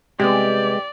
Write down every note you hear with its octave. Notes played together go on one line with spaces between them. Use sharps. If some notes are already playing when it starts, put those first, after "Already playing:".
C3 G3 G#3 B3 G4 D5